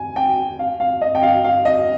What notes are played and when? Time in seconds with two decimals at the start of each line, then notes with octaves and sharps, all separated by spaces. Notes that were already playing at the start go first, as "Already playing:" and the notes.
Already playing: G#5
0.16 G5
0.59 F5
0.80 F5
1.01 D#5
1.15 G5
1.23 F5
1.44 F5
1.65 D#5